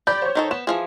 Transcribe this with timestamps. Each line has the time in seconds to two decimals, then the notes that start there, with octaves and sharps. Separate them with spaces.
0.07 G4 D5 B5 G6
0.22 C5 C#5
0.35 D#3 D#4 A4
0.51 B3 E7
0.67 E3 F3 G#4